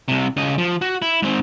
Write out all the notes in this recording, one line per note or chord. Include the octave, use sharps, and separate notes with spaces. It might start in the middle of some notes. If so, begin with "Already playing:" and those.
C2 C3
C#3 D#5
F3
F#4
E4
G#2 C4